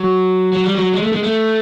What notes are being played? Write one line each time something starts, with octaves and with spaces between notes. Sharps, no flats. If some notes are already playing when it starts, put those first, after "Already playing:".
Already playing: F#3
F#3
G3
F#3
G#3
A3
G#3
A3